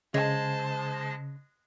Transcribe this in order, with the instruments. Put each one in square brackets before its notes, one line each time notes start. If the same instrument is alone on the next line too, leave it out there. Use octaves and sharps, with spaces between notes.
[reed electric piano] C#3 [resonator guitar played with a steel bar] G#3 [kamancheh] C5 A5